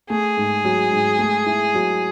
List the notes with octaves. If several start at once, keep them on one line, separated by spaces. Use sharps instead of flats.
A3 G#4
G#2
F#3
G#2
A3
E4
F#3